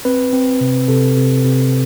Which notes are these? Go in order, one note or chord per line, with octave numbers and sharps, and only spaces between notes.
C4 B4
C4
C3
C3 A4
C3
C3